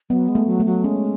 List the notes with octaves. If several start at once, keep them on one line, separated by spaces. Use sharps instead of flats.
F#3 B3
G#3
A3
F#3
A3
F#3
G#3 C#4